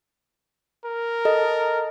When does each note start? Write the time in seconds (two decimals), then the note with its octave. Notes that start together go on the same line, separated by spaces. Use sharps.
0.85 A#4
1.25 A4 D#5